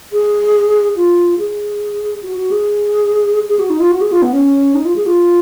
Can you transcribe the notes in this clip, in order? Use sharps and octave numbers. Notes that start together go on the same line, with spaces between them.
G#4
F4
G#4
F#4
F#4
G#4
G#4
F#4
D#4
F4
F#4
G#4
F4
B3
C#4
D#4
F4
G#4
F4